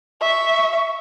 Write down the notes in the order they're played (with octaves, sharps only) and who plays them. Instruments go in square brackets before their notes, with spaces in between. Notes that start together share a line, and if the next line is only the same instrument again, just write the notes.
[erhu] E5 [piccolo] C#6